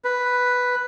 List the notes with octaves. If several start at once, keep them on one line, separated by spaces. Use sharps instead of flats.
B4